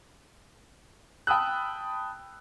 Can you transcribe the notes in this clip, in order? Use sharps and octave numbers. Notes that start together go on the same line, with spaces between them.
G5 A5 B5 D#6 E6 F#6